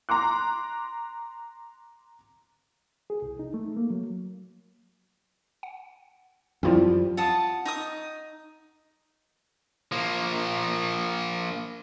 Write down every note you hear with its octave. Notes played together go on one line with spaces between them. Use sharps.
A#5 C6 D6 F#6
G#4
C2
D#4
A3
A#3
F#3
F#5
F#2 F3 G3 C4 E4 F4
F4 F#5 A5 D#6
D#4 C#6 D#6
F3 A#3